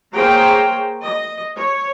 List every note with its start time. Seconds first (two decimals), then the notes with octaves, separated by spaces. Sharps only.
0.12 A#3 G#4 C5 C#5 G5 A#5
1.03 D#5
1.55 C#5